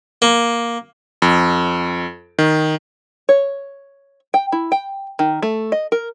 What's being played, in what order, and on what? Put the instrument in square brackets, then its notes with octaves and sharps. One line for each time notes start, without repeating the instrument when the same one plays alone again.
[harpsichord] A#3
[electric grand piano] F2
D#3
[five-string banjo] C#5
G5
E4
G5
D#3
A3
D#5
A#4